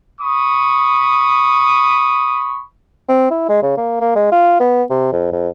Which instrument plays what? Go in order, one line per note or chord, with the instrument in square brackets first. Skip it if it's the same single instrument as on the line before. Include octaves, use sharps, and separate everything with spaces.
[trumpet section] B5 C#6 D#6
[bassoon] C4
E4
G#3
C#3
A#3
A#3
G#3
F4
B3
C3
F2
F2